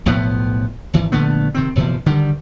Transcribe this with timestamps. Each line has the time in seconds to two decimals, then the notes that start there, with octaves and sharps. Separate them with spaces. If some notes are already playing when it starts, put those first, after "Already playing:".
0.06 B1 A2 F3 B3
0.93 G#1 E3
1.12 A#1 D3 A3 B3
1.55 C3 D#3 C4
1.76 F#1 B2 E3 F3
2.06 D3 D#3 G3